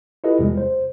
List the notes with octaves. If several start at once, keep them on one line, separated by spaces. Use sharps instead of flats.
E4 F4 G4 A4 B4 D#5
E2 C3 G3 G#3
C5